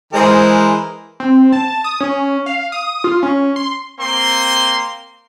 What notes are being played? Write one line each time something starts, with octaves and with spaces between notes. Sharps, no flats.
E3 G#3 G#4 A#4 C5
C4
A5
A5
D#6
C#4
F5
D#6
F4
C#4
C6
A#3 C4 C6